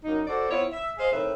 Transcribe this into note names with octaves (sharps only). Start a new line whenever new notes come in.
F#2 A#3 D#4
F#4 A4 C5 D5
B3 C4 E4 F4 C#5
E5
G#4 C5 D#5 F5
A2 D#3 C4 B4 E5